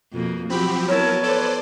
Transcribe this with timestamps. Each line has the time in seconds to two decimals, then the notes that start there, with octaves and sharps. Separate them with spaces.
0.13 F2 B2 A#3
0.50 F3 F#3 C4 F#4 G4 B5
0.88 F#3 B3 E4 A#4 C#5 A5
1.23 A4 B4 C5 D5